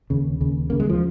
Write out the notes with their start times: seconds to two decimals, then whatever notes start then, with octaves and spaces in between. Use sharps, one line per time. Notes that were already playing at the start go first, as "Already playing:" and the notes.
0.10 D#2 C#3
0.41 D#2 C#3
0.70 D#2 C#3 A#3
0.80 G#3
0.90 F3